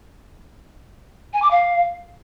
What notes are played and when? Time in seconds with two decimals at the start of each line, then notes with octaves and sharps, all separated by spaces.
1.33 G#5
1.42 D6
1.51 F5